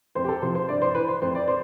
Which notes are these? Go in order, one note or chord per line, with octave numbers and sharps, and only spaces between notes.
F2 C5
G4
A4
C3 F3 C5
C5
G2 D5
C5
E3 B4
C5
F2 C5
D5
C5